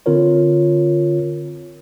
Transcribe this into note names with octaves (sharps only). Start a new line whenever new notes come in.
D3 C4 F4 A#4 C#5